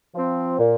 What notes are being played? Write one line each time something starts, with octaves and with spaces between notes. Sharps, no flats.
F3 C4
A#2